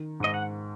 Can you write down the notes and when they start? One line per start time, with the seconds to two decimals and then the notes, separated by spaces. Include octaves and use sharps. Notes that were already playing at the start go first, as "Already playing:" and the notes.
Already playing: D#3
0.20 G#2 D#5
0.34 F#5